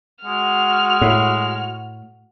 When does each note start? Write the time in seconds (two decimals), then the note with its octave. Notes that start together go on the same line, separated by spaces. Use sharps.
0.25 G#3 F#4 F6
1.01 A2